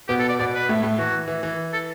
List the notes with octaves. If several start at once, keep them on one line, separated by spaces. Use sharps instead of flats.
B2 B3 G4
A4
D5
B2 B3 D5
B4
A2 A3
A2 A3
E3 F#4
E3
E3
A4